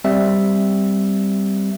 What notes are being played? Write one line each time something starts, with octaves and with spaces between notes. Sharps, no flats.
G3 C4 E5